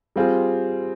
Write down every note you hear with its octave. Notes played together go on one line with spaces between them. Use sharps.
G3 C4 F4 G#4